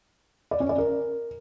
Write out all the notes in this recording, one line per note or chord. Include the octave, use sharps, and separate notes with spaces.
D5
C#4
D5
A#4